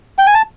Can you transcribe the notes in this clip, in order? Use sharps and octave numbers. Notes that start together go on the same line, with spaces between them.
G5
G#5
A5